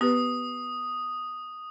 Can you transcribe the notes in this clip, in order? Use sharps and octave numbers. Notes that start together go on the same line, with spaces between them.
B3 G4 B4 D#6